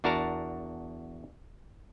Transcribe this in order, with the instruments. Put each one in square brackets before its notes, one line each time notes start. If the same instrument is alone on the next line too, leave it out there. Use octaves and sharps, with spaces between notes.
[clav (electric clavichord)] E2 D4 F#4 A#4 A5 A#5